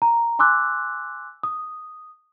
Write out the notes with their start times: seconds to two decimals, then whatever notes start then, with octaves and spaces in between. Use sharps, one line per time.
0.02 A#5
0.39 G#5 C6 D6 E6 F#6
1.43 D#6